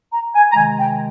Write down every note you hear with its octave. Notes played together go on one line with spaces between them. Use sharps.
A#5
G#5
A#5
C3 D#3 G#3 G#5
G5